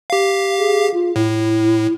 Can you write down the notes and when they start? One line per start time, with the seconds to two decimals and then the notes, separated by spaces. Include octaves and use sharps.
0.10 G4 F5
0.58 G#4
0.94 F4
1.16 A2 E4